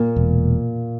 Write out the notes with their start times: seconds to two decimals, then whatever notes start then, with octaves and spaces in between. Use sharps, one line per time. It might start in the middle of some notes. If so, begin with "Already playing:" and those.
Already playing: A#2 A#3
0.16 E1